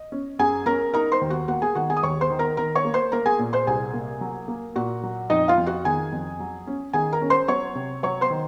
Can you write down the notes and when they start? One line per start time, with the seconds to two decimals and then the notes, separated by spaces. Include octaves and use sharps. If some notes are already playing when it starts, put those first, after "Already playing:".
Already playing: D#5
0.12 C#4
0.39 F#2 G#4 G#5
0.66 C#4 A#4 A#5
0.93 D#4 A#4 A#5
1.12 C5 C6
1.21 D#2
1.30 F#4 F#5
1.48 A#3 F#4 F#5
1.62 G#4 G#5
1.75 D#3 F#4 F#5
1.90 G#4 G#5
1.97 D#6
2.03 D#2 C#5 C#6
2.21 C5 C6
2.30 D#3
2.39 A#4 A#5
2.57 D#3 A#4 A#5
2.75 C#5 C#6
2.85 A#3
2.94 C5 C6
3.12 A#3 A#4 A#5
3.26 G#4 G#5
3.39 A#2
3.53 C5 C6
3.67 C2 G#4 G#5
3.94 A#3
4.21 F#3
4.48 A#3
4.76 A#2 F#4 F#5
5.03 F#3
5.30 F2 D#4 D#5
5.48 F4 F5
5.58 F2
5.66 F#4 F#5
5.85 D#3 G#4 G#5
6.12 F2
6.40 F#3
6.67 C#4
6.93 D#3 G#4 G#5
7.13 A#4 A#5
7.21 C#4
7.30 C5 C6
7.48 F#3 C#5 C#6
7.75 C3
8.03 F#3 C#5 C#6
8.21 C5 C6
8.31 D#3